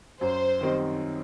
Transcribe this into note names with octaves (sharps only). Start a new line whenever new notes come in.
F#2 C5
D#3 G3 C4 D#4